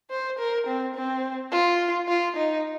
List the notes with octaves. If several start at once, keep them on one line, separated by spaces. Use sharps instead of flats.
C5
A#4
C4
C4
F4
F4
D#4